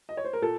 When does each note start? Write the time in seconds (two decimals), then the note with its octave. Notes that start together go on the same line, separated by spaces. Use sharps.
0.09 D#5
0.17 C#5
0.25 C5
0.33 A#4
0.42 A#2 A4